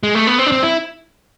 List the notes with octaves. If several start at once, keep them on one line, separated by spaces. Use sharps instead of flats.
G#3
A3
B3
C4
D4
C4
E4